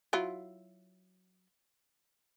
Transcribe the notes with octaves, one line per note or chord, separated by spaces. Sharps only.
F#3 E4 F4